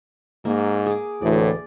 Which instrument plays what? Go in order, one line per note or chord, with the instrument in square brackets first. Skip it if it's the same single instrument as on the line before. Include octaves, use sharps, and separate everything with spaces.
[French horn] G#2 [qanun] A#3
[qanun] G#4 D6
[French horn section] D2 E3 [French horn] A2 [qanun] D5